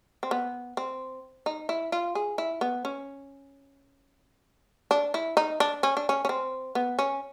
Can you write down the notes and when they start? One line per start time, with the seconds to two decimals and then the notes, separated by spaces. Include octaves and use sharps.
0.23 C4
0.31 B3
0.77 C4
1.46 D#4
1.69 E4
1.92 F4
2.15 G#4
2.38 E4
2.61 B3
2.85 C#4
4.91 D4
5.14 E4
5.37 D#4
5.60 D4
5.83 C#4
5.97 D4
6.09 C#4
6.25 C#4
6.29 C4
6.75 B3
6.99 C#4